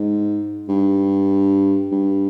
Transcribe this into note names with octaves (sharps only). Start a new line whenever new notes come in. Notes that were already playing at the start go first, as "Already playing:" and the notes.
Already playing: G#2
G2
G2